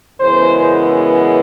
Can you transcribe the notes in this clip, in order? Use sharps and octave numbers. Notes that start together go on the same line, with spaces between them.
F#2 C#3 E3 G#3 B3 C5